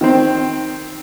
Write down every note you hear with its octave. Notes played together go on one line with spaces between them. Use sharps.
D#3 C4